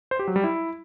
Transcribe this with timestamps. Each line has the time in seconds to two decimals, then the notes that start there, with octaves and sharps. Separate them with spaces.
0.11 C5
0.19 G4
0.28 F#3
0.36 G3
0.44 E4